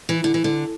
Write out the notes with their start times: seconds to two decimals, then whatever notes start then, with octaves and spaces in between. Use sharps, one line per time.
0.09 E3
0.24 D3
0.34 E3
0.44 D3